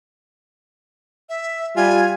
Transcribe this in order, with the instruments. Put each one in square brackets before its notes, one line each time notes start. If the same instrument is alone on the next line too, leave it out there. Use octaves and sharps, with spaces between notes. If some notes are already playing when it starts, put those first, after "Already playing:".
[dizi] E5
[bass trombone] G3 [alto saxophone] F4 [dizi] G#5